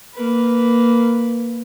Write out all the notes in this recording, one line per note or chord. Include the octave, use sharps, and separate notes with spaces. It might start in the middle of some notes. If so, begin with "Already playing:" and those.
A#3 B4